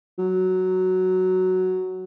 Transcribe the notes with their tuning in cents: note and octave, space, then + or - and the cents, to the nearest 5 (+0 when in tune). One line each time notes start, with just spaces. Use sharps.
F#3 +5